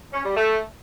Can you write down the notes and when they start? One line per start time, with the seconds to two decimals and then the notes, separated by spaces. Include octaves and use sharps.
0.13 C#4
0.25 G3
0.36 A3